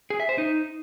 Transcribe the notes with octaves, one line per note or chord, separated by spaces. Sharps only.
G#4
E5
C5
D#4